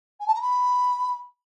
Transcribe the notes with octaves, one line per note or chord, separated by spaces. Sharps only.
G#5
A5
A#5
B5